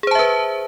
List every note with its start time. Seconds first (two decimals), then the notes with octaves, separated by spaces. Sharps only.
0.03 G#4
0.07 C5
0.11 A5
0.15 E5
0.19 B4